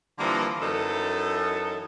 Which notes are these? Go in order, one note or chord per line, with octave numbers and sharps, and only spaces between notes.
D3 E3 F3 G3 A#3
F#2 E3 D#4 A4